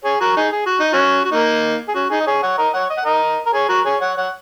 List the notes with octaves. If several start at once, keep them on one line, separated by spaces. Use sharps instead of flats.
G#4 C#5
F#4 A#4
D#4 G#4
G#4
F#4
D#4
C#4 F#4
F#4
A#3 D#4
G#4
C#4 F#4
D#4 G#4
D#5
G#4 C#5
C#5 F#5
A#4 D#5
C#5 F#5
D#5
F#5
A#4 D#5
A#4
G#4 C#5
F#4 A#4
G#4 C#5
C#5 F#5
C#5 F#5